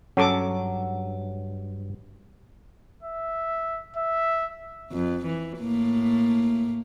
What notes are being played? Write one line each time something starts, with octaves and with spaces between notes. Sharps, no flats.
G2 F#3 C#4 A4 D6
E5
E5
F2
E3
A2 A#3